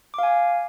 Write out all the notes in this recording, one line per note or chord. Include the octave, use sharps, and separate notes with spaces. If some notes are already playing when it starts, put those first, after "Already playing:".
F5 G#5 D6